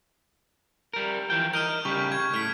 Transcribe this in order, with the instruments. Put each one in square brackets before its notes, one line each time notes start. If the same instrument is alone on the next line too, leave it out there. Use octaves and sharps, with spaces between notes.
[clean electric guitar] G3 A#4
E3 F3 G5
[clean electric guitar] A#4 D#5 [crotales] F6 G6
[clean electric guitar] C#3 G3 G4 [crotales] C#6
[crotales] G#6
[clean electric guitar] A2 [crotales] F6 B6